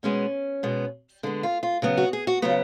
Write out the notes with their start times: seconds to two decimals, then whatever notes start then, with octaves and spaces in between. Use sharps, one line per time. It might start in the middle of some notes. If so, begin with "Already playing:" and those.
0.03 B2 G#3 B3 C#4
0.63 B2 G#3 B3
1.23 D3 G#3 B3 D4
1.43 F4
1.63 F4
1.82 C#3 F#3 B3
1.97 F#4
2.13 G#4
2.27 F#4
2.42 C#3 F#3 B3 F4